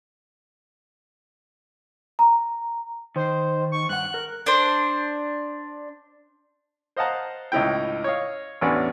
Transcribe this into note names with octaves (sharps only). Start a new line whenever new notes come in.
A#5
D#3 C5
C#6
G2 F#5 F#6
A#4
D4 C5
C5 D#5 F5 F#5 A5 A#5
C#2 A2 D#4 E4 G5
C#5 D#5 F5
A1 E2 C#4 D4 B4 F#5